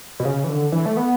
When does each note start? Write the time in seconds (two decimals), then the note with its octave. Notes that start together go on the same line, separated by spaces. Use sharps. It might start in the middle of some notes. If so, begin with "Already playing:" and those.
0.20 B2
0.25 C#3
0.44 E3
0.49 D3
0.72 E3
0.86 A3
0.97 B3